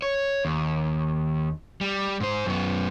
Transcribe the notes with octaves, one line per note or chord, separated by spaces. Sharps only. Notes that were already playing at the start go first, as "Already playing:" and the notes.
C#5
D#2
G3
G#2 C5
F#2 B3